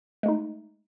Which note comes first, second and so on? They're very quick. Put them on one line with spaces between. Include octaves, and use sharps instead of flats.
G#3 A3 D#4